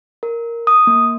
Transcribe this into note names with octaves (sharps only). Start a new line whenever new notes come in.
A#4
D#6
A#3